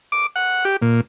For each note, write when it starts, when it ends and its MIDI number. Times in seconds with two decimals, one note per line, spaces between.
0.12 0.27 86
0.36 0.65 78
0.65 0.77 67
0.82 1.01 46